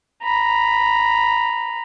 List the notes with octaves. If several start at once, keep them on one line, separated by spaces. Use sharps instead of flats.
A#5 B5